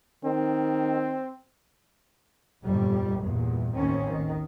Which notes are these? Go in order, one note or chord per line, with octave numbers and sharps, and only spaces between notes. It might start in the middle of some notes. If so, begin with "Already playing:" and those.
D#3 C4
G1 F2 A#2 G3
E2 G2 A#2
A1 D#2 D#3 C4 C#4
A1 D#3